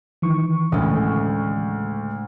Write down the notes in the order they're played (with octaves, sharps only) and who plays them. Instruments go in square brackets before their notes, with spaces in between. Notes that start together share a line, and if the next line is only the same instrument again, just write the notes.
[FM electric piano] D#3 E3 C#6
[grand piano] D2 [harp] A2 C#3 G#3